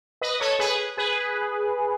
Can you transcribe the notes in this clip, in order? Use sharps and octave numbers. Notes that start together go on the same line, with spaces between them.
B4 D#5
A4 C#5
G#4 B4
G#4 B4